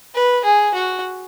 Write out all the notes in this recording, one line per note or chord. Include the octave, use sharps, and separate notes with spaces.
B4
G#4
F#4